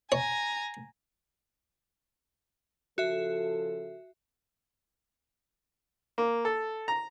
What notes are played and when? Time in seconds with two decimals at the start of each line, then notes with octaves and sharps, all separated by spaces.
0.12 C#5 G#5 A#5
2.98 C#3 F3 F#4 A4 E5
6.18 A#3
6.45 A4
6.88 A#5